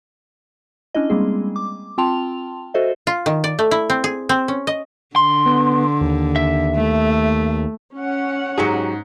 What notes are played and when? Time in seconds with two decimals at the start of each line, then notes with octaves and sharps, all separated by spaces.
0.95 C#4 D4 E4 D#5
1.10 G3 G#3 A#3 C4 G#4
1.56 D6
1.98 C4 F4 G5 A5 C6 F7
2.74 F#4 A4 C5 D#5 E5
3.07 F4
3.26 D#3
3.44 D5
3.59 A3
3.71 E4
3.90 C4
4.04 G#4
4.29 C4
4.48 C#4
4.67 D#5
5.16 D3 C6
5.46 B3
6.01 D#2
6.36 E5
6.75 A3
7.95 C#4 F#5
8.58 G#2 F#3 G4 G#4 A#5 C#7